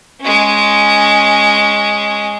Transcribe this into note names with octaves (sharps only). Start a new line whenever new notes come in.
G#3 C#4